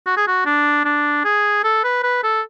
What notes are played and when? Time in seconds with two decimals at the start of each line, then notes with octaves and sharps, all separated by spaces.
0.06 F#4
0.17 G#4
0.27 F#4
0.46 D4
0.85 D4
1.25 G#4
1.64 A4
1.84 B4
2.03 B4
2.23 A4